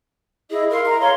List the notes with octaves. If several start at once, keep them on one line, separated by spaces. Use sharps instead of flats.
E4 G#4 D#5
A#4 F5 C6
A#5
A#4 C#5 F5 C6